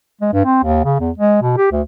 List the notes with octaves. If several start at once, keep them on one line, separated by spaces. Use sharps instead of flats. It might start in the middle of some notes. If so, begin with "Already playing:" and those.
G#3
G2
C4
D#2
C#3
E2
G#3
B2
G4
D2